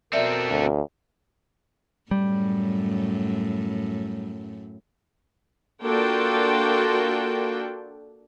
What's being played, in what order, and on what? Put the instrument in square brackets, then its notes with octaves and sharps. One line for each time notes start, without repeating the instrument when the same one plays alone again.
[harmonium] B2 A#4 [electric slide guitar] C4 A4 [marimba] D5 E5
[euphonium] D2
[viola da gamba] F#2 A2 [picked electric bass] G3
[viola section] A#3 D4 F4 F#4 A4 G5